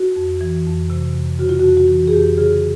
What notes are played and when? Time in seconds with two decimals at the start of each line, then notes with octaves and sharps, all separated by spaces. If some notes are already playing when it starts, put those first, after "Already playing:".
Already playing: F#4
0.16 F2
0.41 E3
0.66 F2
0.90 C3
1.15 F2
1.39 C#3 F#4
1.49 F4
1.59 F#4
1.65 F2
1.77 F#4
1.88 E3
2.08 G#4
2.13 F2 G4
2.38 C#3 G#4